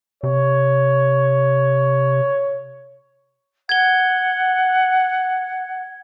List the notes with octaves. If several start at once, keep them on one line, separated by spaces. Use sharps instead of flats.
C3 C#5
F#5 G#6 G7